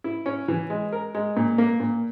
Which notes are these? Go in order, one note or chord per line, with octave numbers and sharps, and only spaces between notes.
E4
C#4
E3
G#3
A#4
G#3
A#2
A#3
A#2